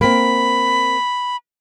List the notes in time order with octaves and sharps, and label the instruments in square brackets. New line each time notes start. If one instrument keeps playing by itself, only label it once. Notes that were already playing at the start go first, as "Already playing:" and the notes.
[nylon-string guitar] A#3 C4 [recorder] B5